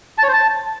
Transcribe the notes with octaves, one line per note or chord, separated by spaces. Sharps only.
A5
C#5
C5
A5